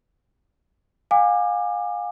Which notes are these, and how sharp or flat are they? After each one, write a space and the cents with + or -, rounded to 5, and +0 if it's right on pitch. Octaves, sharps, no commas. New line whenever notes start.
F5 +35 G#5 -30 D6 +30